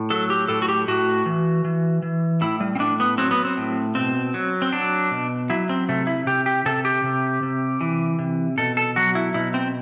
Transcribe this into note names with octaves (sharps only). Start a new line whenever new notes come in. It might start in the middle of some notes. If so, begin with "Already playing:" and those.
Already playing: A2
F#3 A4
G4
A2 A4
F#4
G4
A2 F#4
E3
E3
E3
A2 E4
G3
C4
A2 D4
B3
F#3 C4
B3
C4
A2
B2 C4
F#3
C4
F#3 D4
B2
F#3 E4
C4
C3 A3
E4
C3 G4
G4
C3 A4
G4
C3
C3
E3
C3
B2 A4
A4
F#3 F#4
E4
B2 E4
C4